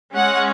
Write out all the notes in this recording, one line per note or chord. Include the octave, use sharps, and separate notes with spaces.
G#3 C#4 F#5